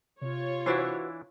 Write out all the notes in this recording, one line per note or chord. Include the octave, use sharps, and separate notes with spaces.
C3 F4 C#5
E3 D4 E4 F#4 B4 C5